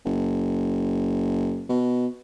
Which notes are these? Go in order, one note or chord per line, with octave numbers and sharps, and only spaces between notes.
F#1
B2